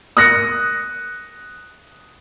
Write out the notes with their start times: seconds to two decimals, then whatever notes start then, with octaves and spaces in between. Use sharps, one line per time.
0.17 D#6 F#6 A#6 C#7